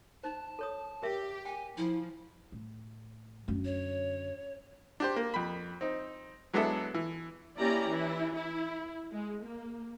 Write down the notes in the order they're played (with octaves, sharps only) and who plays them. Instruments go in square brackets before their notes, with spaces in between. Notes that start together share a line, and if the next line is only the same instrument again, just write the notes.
[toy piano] D#4 C5 [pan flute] A5
[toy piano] A4 C#5 D#6
[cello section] G4 [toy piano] A#4 E5
[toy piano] G5 [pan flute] G#5
[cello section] F3 [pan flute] E4
[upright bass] A2
F#2 D3
[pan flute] C#5
[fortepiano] D4 G4 C5
A#3
F2 B5
C4 D#4
F#3 G#3 B3 D4 E4 A4
E3
[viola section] A#3 C#4 E4 G4 D5 A#5
E3 E4
E4
G#3
A#3